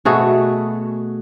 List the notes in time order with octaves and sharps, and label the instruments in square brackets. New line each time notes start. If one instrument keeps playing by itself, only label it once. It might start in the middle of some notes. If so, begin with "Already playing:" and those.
[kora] B2 A3 F#4 G#4